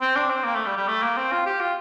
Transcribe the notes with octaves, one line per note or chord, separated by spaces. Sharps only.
C4
D4
C4
A#3
A3
G3
G3
A3
A#3
C4
F4
G4
F4